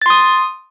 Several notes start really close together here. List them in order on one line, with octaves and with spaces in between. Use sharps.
A6 C6 D#6